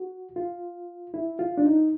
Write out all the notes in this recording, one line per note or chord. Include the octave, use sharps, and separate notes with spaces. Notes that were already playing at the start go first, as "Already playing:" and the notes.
Already playing: F#4
F4
E4
F4
D4
D#4